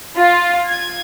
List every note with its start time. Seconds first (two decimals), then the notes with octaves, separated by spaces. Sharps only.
0.17 F4
0.68 G#6